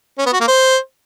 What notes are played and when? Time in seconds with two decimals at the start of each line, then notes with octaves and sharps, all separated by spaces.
0.18 C#4
0.26 B3
0.33 F#4
0.40 A#3
0.48 C5